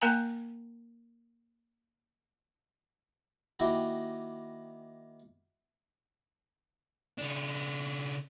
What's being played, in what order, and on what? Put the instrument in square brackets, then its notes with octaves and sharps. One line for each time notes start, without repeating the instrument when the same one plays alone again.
[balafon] A#3 A#4 F5 G#5 A#5
[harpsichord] D#3 A#3 E4 F#4 G4
[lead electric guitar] C#3 D4